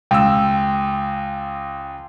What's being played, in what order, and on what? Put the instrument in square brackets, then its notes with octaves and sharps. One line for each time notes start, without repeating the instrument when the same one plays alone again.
[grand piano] C#2 E6 [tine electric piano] G5